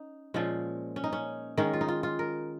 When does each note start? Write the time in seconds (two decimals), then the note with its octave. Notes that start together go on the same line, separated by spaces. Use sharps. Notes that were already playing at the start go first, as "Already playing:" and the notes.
Already playing: C#4 D#4
0.34 A#2 F3 G#3 C#4
0.96 C#4
1.04 D#4
1.13 C#4
1.57 D#3 G#3 C#4 D#4
1.73 F4
1.81 D#4
1.88 F4
2.03 F4
2.19 A#4